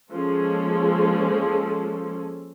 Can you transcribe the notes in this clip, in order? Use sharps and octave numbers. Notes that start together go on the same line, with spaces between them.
F3 G#3 A#3 C#4 G#4 A4